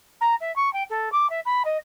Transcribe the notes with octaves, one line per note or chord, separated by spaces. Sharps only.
A#5
E5
C#6
G5
A4
D6
E5
B5
D#5